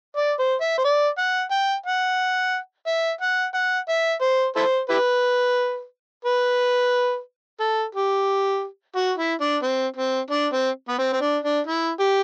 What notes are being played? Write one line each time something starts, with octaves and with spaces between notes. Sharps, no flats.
D5
C5
E5
C5
D5
F#5
G5
F#5
E5
F#5
F#5
E5
C5
E4 A4 C5
E4 G4 B4
B4
A4
G4
F#4
E4
D4
C4
C4
D4
C4
B3
C4
C4
D4
D4
E4
G4